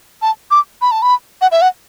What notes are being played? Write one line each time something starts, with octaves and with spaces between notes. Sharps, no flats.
A5
D6
B5
A5
B5
F#5
E5
F#5